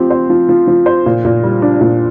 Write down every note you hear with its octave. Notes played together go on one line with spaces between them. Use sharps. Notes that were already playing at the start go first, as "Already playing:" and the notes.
Already playing: F3 C4 G4
C5
F3
F3
F3
C5
A#2
A#2
G3
D4
A#2